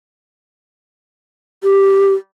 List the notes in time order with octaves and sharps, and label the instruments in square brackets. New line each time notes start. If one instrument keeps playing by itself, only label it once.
[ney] G4